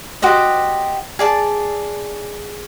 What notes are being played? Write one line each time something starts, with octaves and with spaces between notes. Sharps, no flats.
F#4 G4 C5 D#5
G#4 D5 A5